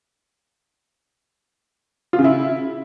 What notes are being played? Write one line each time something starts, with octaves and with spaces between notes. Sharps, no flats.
F4
C#3
E4